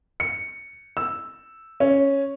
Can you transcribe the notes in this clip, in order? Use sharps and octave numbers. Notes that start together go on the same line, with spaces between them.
C#7
E6
C#4